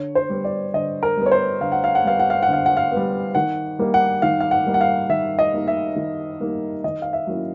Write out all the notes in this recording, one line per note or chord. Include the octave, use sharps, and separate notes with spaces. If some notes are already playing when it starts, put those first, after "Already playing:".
Already playing: D3 C#5
C5
G3 B3
D5
D3 D#5
A#4
G3 B3
C#5
C5
D3 F5
F#5
F5
F#5
G3 B3 F5
F#5
F5
F#5
D3 F5
F#5
F5
G3 B3
D#3 F#5
G3 A#3 D#4
F#5
D#3 F5
F5
F#5
G3 A#3 D#4
F#5
F5
D#3 E5
D#5
G3 A#3 D#4
E5
D#3
G3 A#3 D#4
D#3 D#5
F5
E5
F#3 A#3 C#4 E4